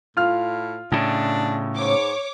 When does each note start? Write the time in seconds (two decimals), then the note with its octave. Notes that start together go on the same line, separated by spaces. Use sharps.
0.17 A2 F4 F6
0.92 A2 C#3 D4
1.76 G#2 C#5 D6